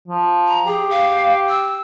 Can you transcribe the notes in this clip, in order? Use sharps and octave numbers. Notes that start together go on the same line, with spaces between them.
F3
A#5
G4 G#4
F5
E6